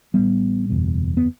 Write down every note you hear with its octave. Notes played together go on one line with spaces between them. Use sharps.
A1 A2 G3 B3
F#1 E2 B2
B3